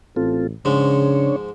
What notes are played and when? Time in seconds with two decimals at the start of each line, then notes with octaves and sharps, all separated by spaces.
0.16 A1 C4 F4 A4
0.65 G#2 C#3 F3 G#3 D4 C#5